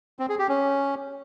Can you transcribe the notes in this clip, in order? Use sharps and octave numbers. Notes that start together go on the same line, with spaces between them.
C4
G#4
G4
C#4